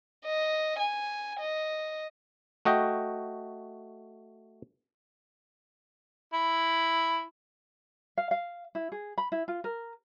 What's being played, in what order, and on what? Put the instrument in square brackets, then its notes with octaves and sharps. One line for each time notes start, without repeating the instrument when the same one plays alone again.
[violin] D#5
G#5
D#5
[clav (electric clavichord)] A3 F#4 D#5 G5
[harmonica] E4
[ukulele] F5
F5
E4
G#4
B5
E4
F4
A#4